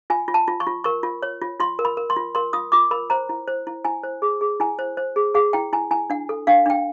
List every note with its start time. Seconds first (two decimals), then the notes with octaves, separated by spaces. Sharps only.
0.10 F4 G#5
0.28 F4
0.34 A5
0.48 F4
0.60 C#6
0.67 F4
0.84 A#4 C#6
1.03 F4
1.23 C#5
1.41 F4
1.60 F4 C6
1.79 A#4
1.85 B5
1.97 A#4
2.10 C6
2.16 F4
2.35 A#4 C6
2.53 F4 D#6
2.72 F4 D6
2.91 A#4 B5
3.10 C5 A#5
3.29 E4
3.48 C5
3.67 E4
3.85 E4 G#5
4.03 C5
4.22 G#4
4.41 G#4
4.60 E4 G#5
4.79 C5
4.97 C5
5.16 G#4
5.34 G#4 F#5
5.53 E4 G5
5.73 E4 G#5
5.91 E4 G#5
6.10 D4 F#5
6.29 A4
6.47 D4 F5
6.66 D4 G5